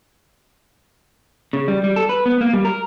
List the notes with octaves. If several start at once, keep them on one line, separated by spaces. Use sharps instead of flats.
C#3
G3
G3
A4
B4
B3
A#3
G3
A#4